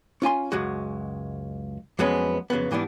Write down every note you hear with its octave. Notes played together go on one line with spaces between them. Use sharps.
C#4 F4 G#5 C6
C#2 F#2 G#3 F#4
F2 F#3 G#3 B3 C#4
F2 C#3 F#3 B3
G#2 E3 G3 B3 D4